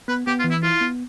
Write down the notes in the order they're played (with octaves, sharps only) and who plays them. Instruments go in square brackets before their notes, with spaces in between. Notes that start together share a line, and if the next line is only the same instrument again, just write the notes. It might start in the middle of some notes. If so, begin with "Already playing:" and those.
[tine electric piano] B3 [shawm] B4
[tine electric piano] B3 [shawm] G4
[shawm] F4
[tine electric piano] E3
[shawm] E4
[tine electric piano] E4 [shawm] F4
[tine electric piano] B3